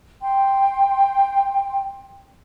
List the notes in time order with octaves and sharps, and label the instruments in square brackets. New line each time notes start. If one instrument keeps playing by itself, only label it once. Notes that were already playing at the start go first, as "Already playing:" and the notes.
[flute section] G5 C6